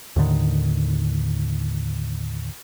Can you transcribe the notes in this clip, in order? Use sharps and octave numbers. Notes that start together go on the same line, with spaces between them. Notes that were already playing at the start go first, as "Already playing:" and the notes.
D#2 A2 D3 D#3